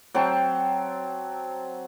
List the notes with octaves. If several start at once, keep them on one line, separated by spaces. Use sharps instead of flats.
F#3 C4 G5 A5